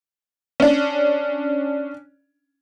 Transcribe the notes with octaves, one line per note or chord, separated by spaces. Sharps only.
C#4 D4